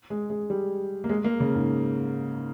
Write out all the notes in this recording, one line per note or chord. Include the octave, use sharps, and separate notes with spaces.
G#3
G#3
G3
A#3
G#3
A#3
C#3
G#2